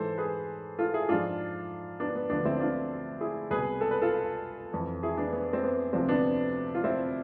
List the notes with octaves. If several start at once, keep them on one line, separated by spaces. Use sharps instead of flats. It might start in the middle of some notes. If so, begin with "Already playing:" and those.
Already playing: G#2 E3 A4 C5
G#4 B4
F4 A4
E4 G#4
G#2 F3 D4 F4
B3 D4
B3
D2 D3 F3 B3 D4
C4 E4
D4 F4
E4 G#4
C2 B2 G#4 B4
A4
B4
F4 A4
F2 E3
E4 G#4
B3 D4
B3
C4
B3
D2 C3 F3 C4
B3 D4
F4
C4 E4